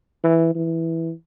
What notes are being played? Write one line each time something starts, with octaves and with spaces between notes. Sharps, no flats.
E3
E3